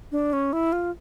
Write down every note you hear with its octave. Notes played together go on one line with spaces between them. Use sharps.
D4
C#4
E4
F4